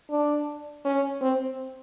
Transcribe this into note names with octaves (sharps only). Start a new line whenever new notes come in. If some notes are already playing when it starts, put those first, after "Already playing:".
D4
C#4
C4